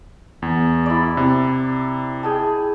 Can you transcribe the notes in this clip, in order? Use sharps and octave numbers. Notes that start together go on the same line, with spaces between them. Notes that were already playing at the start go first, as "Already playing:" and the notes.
E2
E4 D5
C3
G#4 G5 A5